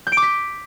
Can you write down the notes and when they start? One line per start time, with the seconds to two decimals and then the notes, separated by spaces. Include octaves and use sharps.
0.07 G6
0.12 D7
0.17 D6
0.22 B6